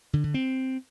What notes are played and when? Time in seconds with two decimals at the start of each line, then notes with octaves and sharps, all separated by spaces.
0.13 D3
0.24 D3
0.34 C4